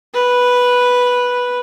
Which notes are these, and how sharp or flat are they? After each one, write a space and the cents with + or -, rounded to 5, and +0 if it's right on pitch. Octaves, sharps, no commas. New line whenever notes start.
B4 -5